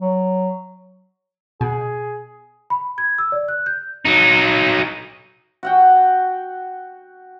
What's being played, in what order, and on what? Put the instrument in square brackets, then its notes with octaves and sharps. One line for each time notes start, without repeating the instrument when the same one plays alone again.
[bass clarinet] F#3
[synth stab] B2 [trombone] G#4
[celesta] B5
G#6
E6
D5
F#6
G6
[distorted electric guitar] F#3 D#4
[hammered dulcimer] F#4 F#5 G5